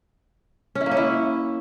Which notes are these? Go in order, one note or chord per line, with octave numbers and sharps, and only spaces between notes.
C#4
E4
A#3
C#4
E4